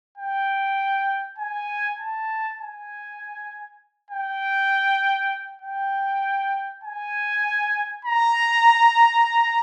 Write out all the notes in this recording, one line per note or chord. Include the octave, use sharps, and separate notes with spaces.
G5
G#5
A5
G#5
G5
G5
G#5
A#5